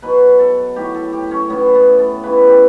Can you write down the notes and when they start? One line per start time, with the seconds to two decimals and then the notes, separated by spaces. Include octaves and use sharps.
0.02 B2 F#3 B4
0.39 A4
0.76 A2 F#3 G4
0.95 A4
1.13 G4
1.31 C#4
1.50 A2 E3 B3
1.75 B3
1.99 A4
2.23 C#3 E3 B4
2.49 G4